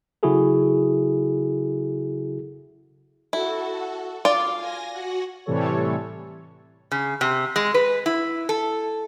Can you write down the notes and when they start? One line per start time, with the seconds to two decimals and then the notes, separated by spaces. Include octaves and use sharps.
0.23 C#3 F#3 E4 F#4 G#4 A4
3.33 E4 F#4 A4
4.25 F4 D5 F5
4.57 G#5 A#6
4.92 F#4 F#5
5.46 A2 C3 E3 G3 A4 C#5
6.92 C#3
7.21 C3
7.56 G#3
7.74 B4
8.06 E4
8.49 A4